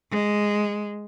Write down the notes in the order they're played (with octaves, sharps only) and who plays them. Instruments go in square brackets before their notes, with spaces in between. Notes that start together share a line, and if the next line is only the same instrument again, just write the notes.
[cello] G#3